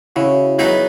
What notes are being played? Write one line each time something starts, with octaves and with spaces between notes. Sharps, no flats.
C#3 E4 F#4
F#3 B3 D#4 E4 F#4 G#4